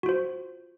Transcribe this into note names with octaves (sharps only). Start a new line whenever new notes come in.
F4 F#4 C5